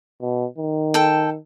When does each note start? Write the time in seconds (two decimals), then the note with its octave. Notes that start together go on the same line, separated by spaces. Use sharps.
0.22 B2
0.59 D#3
0.94 A4 G5